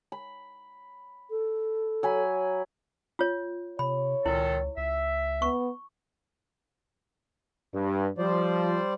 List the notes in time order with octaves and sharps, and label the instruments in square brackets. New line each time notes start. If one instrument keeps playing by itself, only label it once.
[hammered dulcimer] B5
[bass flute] A4
[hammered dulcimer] F#3 G#5 B5
[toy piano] F4 C#5
[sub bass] C3 [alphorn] C#5 [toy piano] B5
[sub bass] C#2 [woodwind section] A#2 D#3 A4 [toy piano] E4
[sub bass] C#2 [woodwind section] E5
[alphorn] B3 [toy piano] C#6
[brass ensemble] G2
[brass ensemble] F3 [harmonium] G3 C5 D5